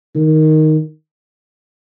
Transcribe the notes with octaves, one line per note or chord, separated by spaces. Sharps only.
D#3